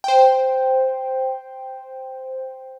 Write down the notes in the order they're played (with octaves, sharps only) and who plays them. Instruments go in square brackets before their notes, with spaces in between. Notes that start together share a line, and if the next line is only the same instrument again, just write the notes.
[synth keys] C5 G5